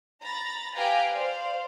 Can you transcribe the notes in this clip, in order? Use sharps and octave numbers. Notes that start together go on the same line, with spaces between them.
A#5 B5 A6
G4 B4 F5 G5 G#5 A#5
C5 D5 F5